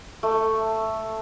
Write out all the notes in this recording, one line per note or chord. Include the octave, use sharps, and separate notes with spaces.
A3